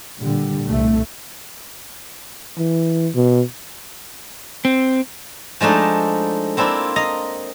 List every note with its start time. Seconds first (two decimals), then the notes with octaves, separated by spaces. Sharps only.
0.19 A#2 D3 G3
0.69 C2 A3
2.58 E3
3.15 B2
4.65 C4
5.61 F3 G#3 A3 D4 D#4
6.57 A#3 C4 D4 E4 F4
6.96 D#5 F5 A#5